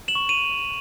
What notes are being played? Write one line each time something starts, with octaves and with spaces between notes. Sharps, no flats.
E7 F#7
C#6
D#7 F7